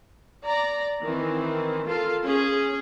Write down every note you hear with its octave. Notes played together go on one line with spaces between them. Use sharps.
D5 A#5
D#3 E3 C4
F4 A4 A#4 F5
C#4 G#4